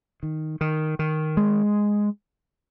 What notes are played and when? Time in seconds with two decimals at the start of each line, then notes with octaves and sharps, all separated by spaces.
0.23 D#3
0.61 D#3
0.99 D#3
1.37 G#3